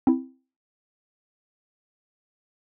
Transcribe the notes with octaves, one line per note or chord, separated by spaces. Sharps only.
C4 E4